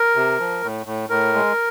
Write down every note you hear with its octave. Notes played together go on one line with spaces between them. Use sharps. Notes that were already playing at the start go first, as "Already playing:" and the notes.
Already playing: A#4
C3
F3
A2
A2
A2 A#4
G#3